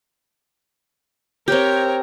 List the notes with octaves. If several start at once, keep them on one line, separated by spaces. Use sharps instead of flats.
C4 G4 A#4 C#5 A#5